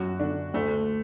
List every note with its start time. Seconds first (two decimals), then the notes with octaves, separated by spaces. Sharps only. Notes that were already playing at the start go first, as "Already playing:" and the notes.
Already playing: F#2 F#4
0.19 D3 D4
0.54 D2 A3